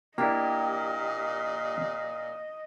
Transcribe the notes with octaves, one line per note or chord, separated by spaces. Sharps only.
A#2 A#3 D4 E4 G4 D#5